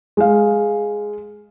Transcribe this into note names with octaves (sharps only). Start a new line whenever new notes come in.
G#3 F5